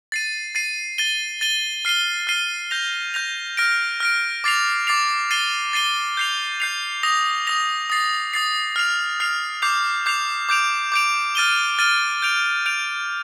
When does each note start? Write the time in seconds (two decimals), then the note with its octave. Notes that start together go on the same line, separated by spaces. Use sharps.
0.12 A6 C7 D#7
0.55 A6 C7 D#7
0.98 A6 D#7 G7
1.41 A6 D#7 G7
1.85 F6 C7 D#7 G7
2.27 F6 C7 D#7 G7
2.71 G6 A#6 F7
3.14 G6 A#6 F7
3.57 F6 A#6 D7
4.00 F6 A#6 D7
4.44 D6 A6 C7 F7
4.87 D6 A6 C7 F7
5.31 A6 C7 D#7 G7
5.73 A6 C7 D#7 G7
6.17 G6 C7 F7
6.60 G6 C7 F7
7.03 D#6 A#6 F7
7.47 D#6 A#6 F7
7.90 D#6 A6 C7
8.33 D#6 A6 C7
8.76 F6 C7 F7
9.20 F6 C7 F7
9.62 D6 G6 C7 F7
10.06 D6 G6 C7 F7
10.49 D6 G6 D7 F7
10.92 D6 G6 D7 F7
11.35 F6 A6 D#7 G7
11.79 F6 A6 D#7 G7
12.22 G6 D7 F7
12.66 G6 D7 F7